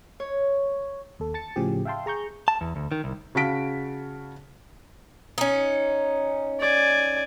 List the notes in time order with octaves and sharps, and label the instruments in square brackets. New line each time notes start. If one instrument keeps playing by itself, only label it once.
[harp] C#5
[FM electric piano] D#2 A4
A5 A6 C#7
A2 C#3 F3 G4 G#4
E5 F5 G5 A5 C6
G#4 A#5 C#6 G6
[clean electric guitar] A5
E2
D2
D#3
C2
[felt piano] C#3 F#4 F5 A5 B6 D7
[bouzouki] C#4 D#4
[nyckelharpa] D5 G#5